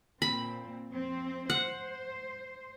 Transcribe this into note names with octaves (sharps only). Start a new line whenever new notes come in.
A#2 C4 B5
F2 C4
C5 F#5